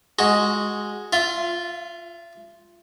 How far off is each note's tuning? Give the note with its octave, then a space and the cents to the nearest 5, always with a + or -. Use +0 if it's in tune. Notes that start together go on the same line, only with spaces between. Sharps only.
G#3 +0 F#4 +0
F4 +0 E5 +40